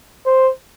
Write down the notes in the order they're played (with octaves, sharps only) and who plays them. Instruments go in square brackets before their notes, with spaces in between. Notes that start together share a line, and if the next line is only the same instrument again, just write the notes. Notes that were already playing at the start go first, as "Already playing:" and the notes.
[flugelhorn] C5